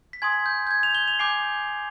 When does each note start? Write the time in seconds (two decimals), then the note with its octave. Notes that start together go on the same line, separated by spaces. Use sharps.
0.13 B6
0.22 G#5 C6 D#6 G#6
0.46 G6
0.67 G6
0.71 G#6
0.83 F7
0.95 G7
1.08 F7
1.19 G#5 D6 G6 C7